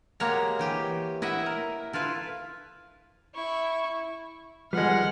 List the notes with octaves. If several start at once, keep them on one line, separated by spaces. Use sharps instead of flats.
G#3 A#3 F#4 G4 C#5 A#5
E3 G4 G5
E4 D#5 E5 F#5
A#4
E4 F4 A4 B4
E4 C#6
D#2 F3 G3 G#3 B4 F#5 F6